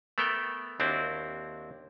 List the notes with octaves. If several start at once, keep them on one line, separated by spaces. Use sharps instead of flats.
A3 B3 A4 A#4 G5
D#2 C4 D4 E4 F#4